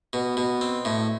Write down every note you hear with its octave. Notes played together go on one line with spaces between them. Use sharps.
B2
B2
C4
A2